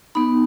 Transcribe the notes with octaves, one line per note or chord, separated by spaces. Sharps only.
B3 D#4 B5